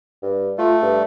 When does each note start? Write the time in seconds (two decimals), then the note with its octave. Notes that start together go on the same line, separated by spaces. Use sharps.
0.23 G2
0.58 A3 F4
0.83 G2